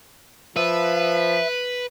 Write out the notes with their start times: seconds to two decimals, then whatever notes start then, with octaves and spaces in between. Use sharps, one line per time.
0.57 F3 B4 E5